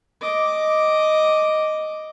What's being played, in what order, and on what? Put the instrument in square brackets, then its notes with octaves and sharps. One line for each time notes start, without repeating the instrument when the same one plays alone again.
[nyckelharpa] D#5 D6